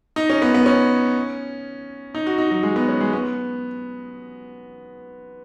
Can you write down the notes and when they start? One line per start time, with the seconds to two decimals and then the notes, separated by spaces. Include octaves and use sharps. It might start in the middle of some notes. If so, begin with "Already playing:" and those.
0.16 D#4
0.30 C#4
0.42 B3
0.54 B3
0.66 C#4
2.15 D#4
2.27 F#4
2.38 D#4
2.51 F#3
2.63 G#3
2.76 B3
2.88 C#4
3.01 G#3
3.13 B3